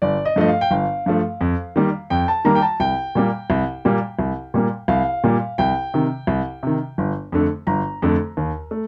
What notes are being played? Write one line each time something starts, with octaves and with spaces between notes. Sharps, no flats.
G1 D5
D#5
G2 F3 A3 D#5
F5
G5
G1 F5
G2 F3 A3
F2
D#3 G3 A#3
F2 G5
A5
D#3 G3 A#3 A#5
G5
A5
C2 G5
A#2 G3 A#3
C2
A#2 G3 A#3
C2
A#2 G3 A#3
C2 F5
A#2 G3 A#3
C2 G5
C3 D#3
C2
C3 D#3
G1
F2 D3 A3
G1 A#5
F2 D3 A3
D#2
A3